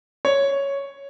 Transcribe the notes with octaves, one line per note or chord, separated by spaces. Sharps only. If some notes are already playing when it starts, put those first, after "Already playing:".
C#5